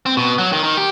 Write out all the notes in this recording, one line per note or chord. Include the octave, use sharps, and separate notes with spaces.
C4
B2
F#3
D#3
D#3
G4